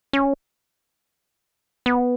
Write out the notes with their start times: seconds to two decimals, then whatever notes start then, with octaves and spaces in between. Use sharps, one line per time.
0.13 C#4
1.86 B3